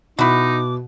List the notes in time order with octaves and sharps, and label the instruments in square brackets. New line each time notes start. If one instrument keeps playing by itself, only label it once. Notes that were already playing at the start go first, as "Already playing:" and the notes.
[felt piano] B2 [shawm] D#4 [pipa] E4 F#4 [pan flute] D6